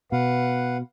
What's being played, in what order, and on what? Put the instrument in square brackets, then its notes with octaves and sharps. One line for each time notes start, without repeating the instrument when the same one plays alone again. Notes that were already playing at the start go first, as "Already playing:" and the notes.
[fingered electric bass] B2 [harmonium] B4 F5 F#5